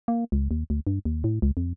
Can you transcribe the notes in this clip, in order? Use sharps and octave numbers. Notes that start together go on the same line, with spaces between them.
A#3
C#2
D#2
D2
G2
D#2
A2
C#2
F2